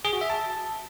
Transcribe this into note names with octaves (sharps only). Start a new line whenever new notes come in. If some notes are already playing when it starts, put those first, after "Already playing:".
G#4
F#4
E5
A5